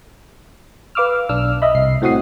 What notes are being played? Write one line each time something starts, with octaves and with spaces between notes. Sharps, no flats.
B4 F5 D6 E6 F6
B1 D4 E6 F6
D#5 E5 B5
C2 C7
A2 C4 F#4 F#5 D#6 C7